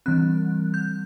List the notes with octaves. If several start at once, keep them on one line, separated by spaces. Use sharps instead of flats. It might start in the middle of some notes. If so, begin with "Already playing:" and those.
E3 G3 C4 F#6
G6